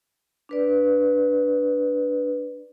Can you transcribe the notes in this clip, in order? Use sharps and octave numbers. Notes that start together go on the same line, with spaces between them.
D4 B4 D5